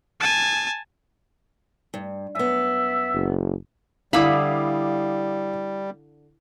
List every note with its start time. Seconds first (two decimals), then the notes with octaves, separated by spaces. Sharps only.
0.20 G#5 A5
1.94 G2
2.35 F#2 B3 E5
3.13 F#1
4.13 D3 G3 E4 F5 B5 D6 D#6